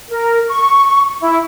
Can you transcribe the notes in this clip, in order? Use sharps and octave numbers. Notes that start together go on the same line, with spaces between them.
A#4
C#6
E4